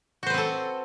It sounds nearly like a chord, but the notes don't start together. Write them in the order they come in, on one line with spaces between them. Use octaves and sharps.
F#4 C5 B4 C4 A4